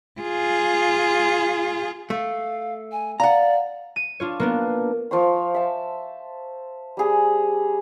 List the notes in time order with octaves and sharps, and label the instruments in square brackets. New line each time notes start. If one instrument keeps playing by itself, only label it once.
[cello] F4 G#4
[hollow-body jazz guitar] A3 [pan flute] F5
[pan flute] G#5
[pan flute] D5 [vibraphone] F5 [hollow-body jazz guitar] F#5 A#5
[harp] D#7
D4 F4 C#5
A#3 B3 D4
[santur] F3 F4 C5 C#6
E5 A5
G3 G#4